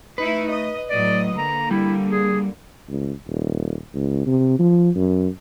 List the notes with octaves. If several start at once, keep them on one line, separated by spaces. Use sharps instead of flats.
A3 D#4 E4 B4
D#5
A2 F#3 D5 D#5
D3 A#3 A#5
G3 E4
G#4
C#2
D#1
C#2
C3
F3
F#2